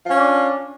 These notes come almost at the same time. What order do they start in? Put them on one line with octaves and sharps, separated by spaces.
F4 C#4 D4